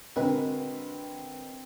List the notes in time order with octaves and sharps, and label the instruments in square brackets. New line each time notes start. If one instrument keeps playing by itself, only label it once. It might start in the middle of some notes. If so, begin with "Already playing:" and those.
[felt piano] D3 A#4 B4 [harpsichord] G#3 F#4 [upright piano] C4